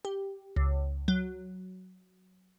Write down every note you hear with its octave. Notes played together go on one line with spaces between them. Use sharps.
G4
C#2
F#3